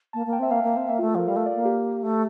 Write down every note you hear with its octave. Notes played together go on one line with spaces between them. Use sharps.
A#3 A5
A#3
G5
C4 E5
A#3 F5
A#3
C4
A#3 E5
A3 F4
A4
F3 A#4
G3 F5
A3
D5
A#3
G4
A3